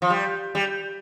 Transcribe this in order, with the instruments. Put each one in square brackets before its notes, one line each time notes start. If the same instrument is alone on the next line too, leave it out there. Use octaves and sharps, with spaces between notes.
[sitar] F3
G3
G3